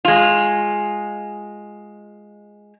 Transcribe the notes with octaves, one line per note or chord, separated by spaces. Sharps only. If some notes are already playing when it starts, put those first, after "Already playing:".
G#3 F4